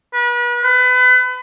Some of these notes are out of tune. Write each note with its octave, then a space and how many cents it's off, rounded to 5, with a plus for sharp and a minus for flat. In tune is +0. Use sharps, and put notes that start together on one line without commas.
B4 -35
B4 +30